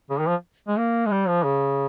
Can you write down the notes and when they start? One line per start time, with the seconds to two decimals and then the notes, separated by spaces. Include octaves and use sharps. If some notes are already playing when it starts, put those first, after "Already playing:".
0.10 C#3
0.19 D#3
0.28 F3
0.68 G#3
0.77 A#3
1.06 G#3
1.11 G3
1.28 F3
1.43 C#3